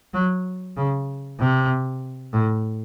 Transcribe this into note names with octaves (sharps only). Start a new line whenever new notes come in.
F#3
C#3
C3
A2